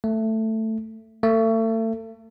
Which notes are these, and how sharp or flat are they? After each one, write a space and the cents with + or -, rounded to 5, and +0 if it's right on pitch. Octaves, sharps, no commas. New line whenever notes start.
A3 +10
A3 +35